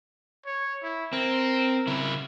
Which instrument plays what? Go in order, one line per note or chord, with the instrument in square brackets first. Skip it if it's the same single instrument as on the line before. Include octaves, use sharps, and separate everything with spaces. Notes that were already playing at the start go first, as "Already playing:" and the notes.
[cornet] C#5
E4
[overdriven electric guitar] C4 [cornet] A#4
[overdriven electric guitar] C#3 E4